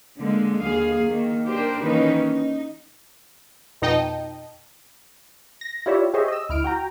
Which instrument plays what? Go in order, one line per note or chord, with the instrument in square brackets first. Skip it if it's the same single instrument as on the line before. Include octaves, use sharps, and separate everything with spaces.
[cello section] D3 G#3 A#3
D#2 G#4 F5
D#3 A#3
D4 G4 A#4 C5
D#3 E3 A#3 C#4 D#4 B4
D#4
[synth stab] F2 B2 D#4 D#5 G5 A5
[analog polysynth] A#6
E4 F4 G4 C#5 D5 E5
G4 G#4 C5 C#5 D#5 E5
D#5 E6
D2 E4 F6 D7
F#4 G5 A#5